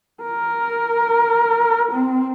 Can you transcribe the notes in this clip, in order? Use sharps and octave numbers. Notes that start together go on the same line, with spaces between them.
A#4
C4